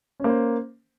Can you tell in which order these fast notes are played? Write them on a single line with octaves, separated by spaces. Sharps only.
C#4 A#3 C5